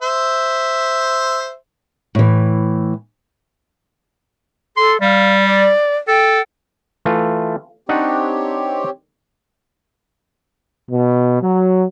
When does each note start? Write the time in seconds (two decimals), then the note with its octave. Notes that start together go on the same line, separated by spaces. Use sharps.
0.02 C5 E5
2.15 A2 E3
4.77 A4 C6
5.01 G3 F5
5.45 D5
6.08 A4 G5
7.05 E3 A3 F4
7.89 C4 D4 D#4 G4 C#5 F#5
10.90 B2
11.41 F#3